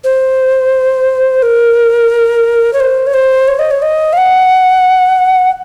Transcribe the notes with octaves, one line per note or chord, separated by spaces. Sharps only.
C5
A#4
C#5
C5
C#5
C5
C#5
D#5
C#5
D#5
F5
F#5